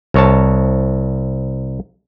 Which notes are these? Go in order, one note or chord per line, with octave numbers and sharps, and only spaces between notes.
C2 C#5 A5